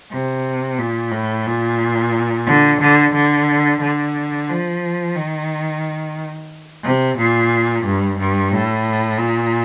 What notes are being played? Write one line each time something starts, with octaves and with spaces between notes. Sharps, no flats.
C3
A#2
A2
A#2
D3
D3
D3
D3
F3
D#3
C3
A#2
G2
G2
A2
A#2